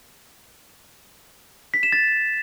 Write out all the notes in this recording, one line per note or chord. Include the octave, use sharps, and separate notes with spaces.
B6
E7
A6